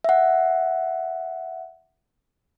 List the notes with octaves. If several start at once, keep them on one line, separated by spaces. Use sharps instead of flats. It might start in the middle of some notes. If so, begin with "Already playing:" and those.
E5 F#5